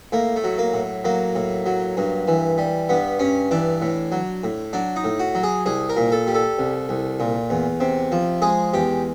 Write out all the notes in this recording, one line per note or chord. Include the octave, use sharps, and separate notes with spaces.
A2 A#3
A3
F#3
A#3
A2
F#3 A#3
A2
F#3
G2
E3
G3
G2 B3
G2 C#4
E3 D4
A2
F#3
A2
F#3 D4
D#4
A2
F#4
F#3
G#4
C2 G#4
A#4
A#2
A4
G3
A4
C2
C2
A#2
E2
C3
F3
G#3 G#4
E2 G4